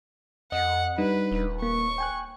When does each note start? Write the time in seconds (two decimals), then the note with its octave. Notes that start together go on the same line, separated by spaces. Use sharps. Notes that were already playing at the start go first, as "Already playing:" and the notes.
0.52 F2 D#5 F#5
0.98 G3 D4 D#4 B4
1.32 D#1
1.62 A#3 C#6
1.98 G5 G#5 F#6